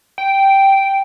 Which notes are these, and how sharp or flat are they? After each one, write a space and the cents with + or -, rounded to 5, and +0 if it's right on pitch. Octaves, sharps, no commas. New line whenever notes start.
G5 -5